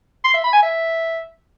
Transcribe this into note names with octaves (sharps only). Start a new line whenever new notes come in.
C6
E5
B5
G#5
E5